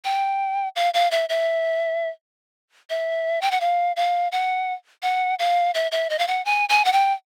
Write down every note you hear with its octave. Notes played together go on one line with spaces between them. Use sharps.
G5
F5
F5
E5
E5
E5
G5
F#5
F5
F5
F#5
F#5
F5
E5
E5
D#5
F5
F#5
G#5
G#5
F#5
G5